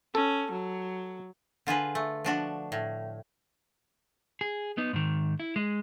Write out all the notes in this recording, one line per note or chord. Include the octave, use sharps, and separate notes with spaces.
C#4 A4
F#3
D3 F4 G#4 B4
A3
F3 D4 F#4
A2
G#4
B3 D#4
G#2 D#3
E4
G#3